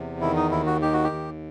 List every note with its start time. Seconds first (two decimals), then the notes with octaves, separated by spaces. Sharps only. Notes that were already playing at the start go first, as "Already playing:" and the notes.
Already playing: E2 C3
0.21 D#3 E4
0.37 D#4
0.51 D#2 E4
0.66 F#4
0.82 D#3 G4
0.93 F#4
1.04 G4
1.12 D#2